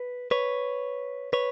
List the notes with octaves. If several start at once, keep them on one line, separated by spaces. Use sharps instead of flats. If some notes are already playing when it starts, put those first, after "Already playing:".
Already playing: B4
B4 C#5
B4 C#5